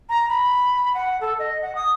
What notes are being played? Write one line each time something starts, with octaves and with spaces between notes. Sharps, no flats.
A#5
B5
F#5
A4
D#5
F#5
D#6